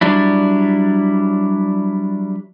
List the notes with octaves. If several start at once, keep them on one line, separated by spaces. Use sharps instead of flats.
F#3 G3 D4 E4